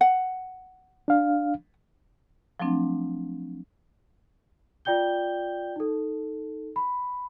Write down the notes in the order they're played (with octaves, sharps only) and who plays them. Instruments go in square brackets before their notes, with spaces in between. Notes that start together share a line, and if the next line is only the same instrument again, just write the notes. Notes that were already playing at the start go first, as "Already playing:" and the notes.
[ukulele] F#5
[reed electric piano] D4 F5
[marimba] F3 F#3 A3 C4 D4
[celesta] F4 D5 G5 G6 G7
D#4 A4
B5